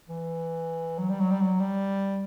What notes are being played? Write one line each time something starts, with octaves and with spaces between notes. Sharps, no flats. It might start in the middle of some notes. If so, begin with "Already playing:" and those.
E3
F#3
G3
F#3
G3
F#3
G3